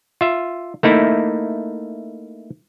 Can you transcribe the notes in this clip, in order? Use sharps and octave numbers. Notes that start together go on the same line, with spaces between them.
F4 E5
A3 A#3 D#4 E4